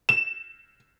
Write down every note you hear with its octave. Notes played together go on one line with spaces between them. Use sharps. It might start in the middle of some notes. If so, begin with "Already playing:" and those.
E7